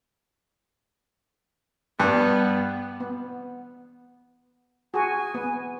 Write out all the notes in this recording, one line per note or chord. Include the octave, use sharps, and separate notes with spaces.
G2 B3
B3
F#4 G#4 G#5
B3